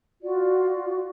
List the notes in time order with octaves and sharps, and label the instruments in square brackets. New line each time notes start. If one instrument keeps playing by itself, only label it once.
[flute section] F4 F#4 D5